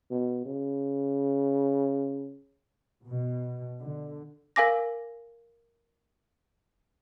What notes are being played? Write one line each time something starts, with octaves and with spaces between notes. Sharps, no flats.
B2
C#3
B2
D3
A#4 F5 G#5 D6 A#6